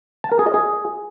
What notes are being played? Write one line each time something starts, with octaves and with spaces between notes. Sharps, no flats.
A5
A#4
G#4
D#5
G#4